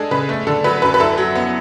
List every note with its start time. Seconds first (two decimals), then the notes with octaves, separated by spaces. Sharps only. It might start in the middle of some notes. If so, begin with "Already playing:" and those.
Already playing: G#3 D4 G#4 A4
0.11 C#3 B4
0.29 A3
0.47 D3 A4
0.64 F#3 B4
0.82 F#2 B4
0.94 B4
1.00 E4 A4
1.18 F#3
1.36 B3